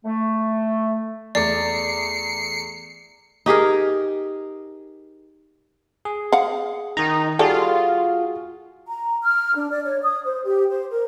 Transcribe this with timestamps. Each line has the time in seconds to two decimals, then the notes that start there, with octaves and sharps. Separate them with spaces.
0.05 A3
1.35 E2 A3 D5 D6 C7 C#7
3.46 D#4 G4 G#4 A#4
6.05 G#4
6.32 F5 F#5
6.97 D#3 D#4 A#5
7.39 G3 F4 F#4 G#4 A4 D5
8.87 A#5
9.22 F6
9.56 D4
9.71 D5
9.85 C#5
10.03 D#6
10.26 C5
10.45 G4
10.70 C5
10.92 A#4